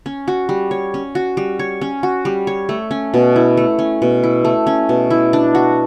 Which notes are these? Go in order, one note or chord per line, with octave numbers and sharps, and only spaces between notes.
C#4
F#4
G3
C#5
C#4
F#4
G3
C#5
C#4
F#4
G3
C#5
A3
C#4
B2
E4
A3
C#4
B2
E4
A3
C#4
B2
E4
D4
F#4